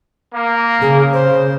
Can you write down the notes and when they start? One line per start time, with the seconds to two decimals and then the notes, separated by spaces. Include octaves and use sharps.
0.33 A#3
0.82 C#3 G#4
1.13 C5